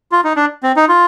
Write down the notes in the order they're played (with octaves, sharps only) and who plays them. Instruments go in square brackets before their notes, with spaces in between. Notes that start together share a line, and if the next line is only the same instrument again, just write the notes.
[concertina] F4
D#4
D4
C4
D#4
F4